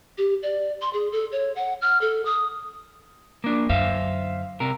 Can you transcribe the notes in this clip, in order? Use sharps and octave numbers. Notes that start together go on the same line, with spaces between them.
G4
D5
C6
G#4
A4
C#5
F#5
F6
A4
D#6
A#3 D4
F#2 D3 C5 E5 F5
C3 A#4